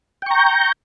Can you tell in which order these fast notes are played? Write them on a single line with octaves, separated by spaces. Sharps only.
G5 C#6 A#5 G6